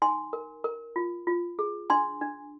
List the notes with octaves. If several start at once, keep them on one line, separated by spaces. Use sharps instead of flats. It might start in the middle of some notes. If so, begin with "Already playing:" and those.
D#4 G#5 C6
A#4
A#4
F4
F4
G#4
D4 G#5 C6
D4